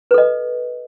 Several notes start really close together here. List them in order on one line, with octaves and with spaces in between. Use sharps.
B4 A4 D#5